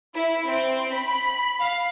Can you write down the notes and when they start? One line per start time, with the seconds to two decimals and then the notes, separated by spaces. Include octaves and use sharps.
0.15 E4
0.45 C4
0.91 B5
1.60 F5